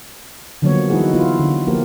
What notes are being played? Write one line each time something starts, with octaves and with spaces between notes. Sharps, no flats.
D3 F3 F#3 A#3 B3 C#5
E3 G#3 D#4 E4 F#4 G#4
B3 E4 F4
D3
F3 A#3 B3 G4 A#4